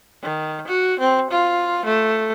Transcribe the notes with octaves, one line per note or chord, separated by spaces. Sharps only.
D#3
F#4
C4
F4
A3